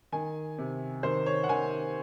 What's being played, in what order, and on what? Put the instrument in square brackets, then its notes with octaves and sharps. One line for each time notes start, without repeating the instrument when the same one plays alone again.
[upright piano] D#3 G#5
C3
D#3 C5
C#5
F#5
D#3 G#5